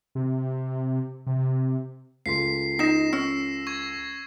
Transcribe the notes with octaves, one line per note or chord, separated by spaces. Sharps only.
C3
C3
C#2 A4 C6 B6 C7
D#4 A#6 E7
C#4 E6
C#6 G#6